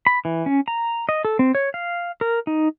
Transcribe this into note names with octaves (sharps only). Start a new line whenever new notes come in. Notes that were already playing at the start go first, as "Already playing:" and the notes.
B5
E3
C#4
A#5
D#5
A4
C4
C#5
F5
A#4
D#4